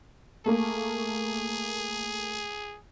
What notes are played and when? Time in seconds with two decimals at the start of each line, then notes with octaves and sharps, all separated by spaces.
0.46 A3 A#3 G#4